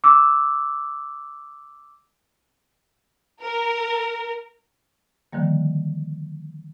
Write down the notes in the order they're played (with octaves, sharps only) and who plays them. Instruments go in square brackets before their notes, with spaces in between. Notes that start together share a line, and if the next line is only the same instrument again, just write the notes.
[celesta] D6 E6
[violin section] A#4
[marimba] D3 D#3 F3 G3 A#3